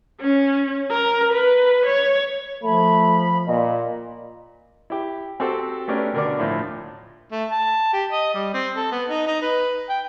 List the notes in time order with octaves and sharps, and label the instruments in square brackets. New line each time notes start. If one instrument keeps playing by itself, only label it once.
[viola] C#4
A#4
B4
C#5
[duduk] F3 [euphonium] A3 [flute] B5
[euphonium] A#2 [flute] D#5
[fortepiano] E4 G4
C4 F#4 G4 A4 C5
A3 B3 C#4 D4 G4 A#4
B2 D3 A#4 D5 D6
D2 A2 F3 F4
[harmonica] A3
A5
G4
D#5
G3
C4
A4
B3
D#4
D#4
B4
G5